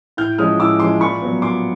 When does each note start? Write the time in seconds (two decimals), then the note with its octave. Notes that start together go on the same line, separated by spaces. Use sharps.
0.17 A2 F6 G6
0.38 F3 G#3 C#4 D#6 F6
0.59 A2 D6 E6
0.80 F3 G#3 C#4 C6 D6
1.00 A#2 B5 C#6
1.22 F#3 B3
1.42 A#2 C6 D6